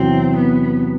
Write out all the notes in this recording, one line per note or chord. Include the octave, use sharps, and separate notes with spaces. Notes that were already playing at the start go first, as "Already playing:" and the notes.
Already playing: E2 C3 F#3 C4
B3